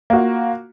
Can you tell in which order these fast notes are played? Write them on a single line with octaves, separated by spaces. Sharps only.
A#3 F#4 F4